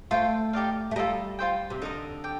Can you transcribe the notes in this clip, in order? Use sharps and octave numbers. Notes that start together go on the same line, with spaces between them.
A3 F4 C5 G5
D#4 G4 D5 F5
A3
G3 F4 A4 D#5 A#5
F4 C5 G5
C3
D3 D#4 A#4 D#5
G4 G5